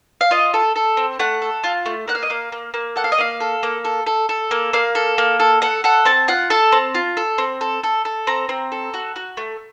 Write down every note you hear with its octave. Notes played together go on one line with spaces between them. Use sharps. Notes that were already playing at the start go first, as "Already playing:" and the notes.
F5
F4 D#5
A4
A4
C4
A3 F#5
A4
F4
A3
A#3 F#5
F5
D#5
A#3 F5
A#3
A#3
A4 F#5
F5
D#5
A#3 F5
A4
A#3
A4
A4
A4
A#3
A#3 F5
A4
A#3
A4
A4 F#5
A4 F#5
C4 A5
F4 F#5
A4 A5
C4
F4
A4
C4
A4
A4
A4
C4 A#5
C4
A4
F#4
F#4
A3